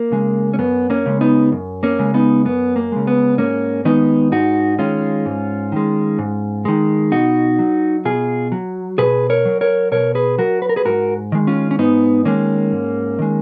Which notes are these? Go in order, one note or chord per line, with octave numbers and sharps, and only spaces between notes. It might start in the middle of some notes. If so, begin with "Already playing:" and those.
Already playing: A#3
C#3 G#3
C#4
F#2 B3
A#3 C#4
C#3 G#3
B3 D#4
F#2
A#3 C#4
C#3 G#3
B3 D#4
F#2 B3
A#3
C#3 G#3
B3
G#2 A#3 C#4
D#3 G#3 B3 D#4
G#2 D#4 F#4
D#3 G#3 C#4 F4
G#2
D#3 G#3
G#2
D#3 G#3
B2 D#4 F#4
F#3
B2 F4 G#4
F#3
B2 G#4 B4
A#4 C#5
F#3
A#4 C#5
B2 A#4 C#5
G#4 B4
F#3 F#4 A#4
B4
A#4
G#4 B4
G#2 F#4 A#4
D#3 G#3
C#4 F4
C#4
G#2 B3 D#4
D#3 G#3 A#3 C#4
G#2
D#3 G#3